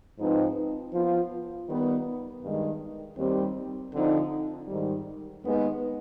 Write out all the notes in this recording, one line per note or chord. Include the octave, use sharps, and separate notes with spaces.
G#2 F3 C4 D#4 B4
F3 B3 F4
D#3 G3 B3
G2 D#3 G#3
D#2 D#3 G3 C4 G4
D3 F3 C4 D#4
G#2 D#3 G3
D#2 D#3 G#3 B3